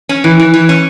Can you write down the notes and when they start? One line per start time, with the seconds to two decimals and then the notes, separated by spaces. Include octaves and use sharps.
0.09 C#4
0.24 E3
0.39 E3
0.54 E3
0.69 C#4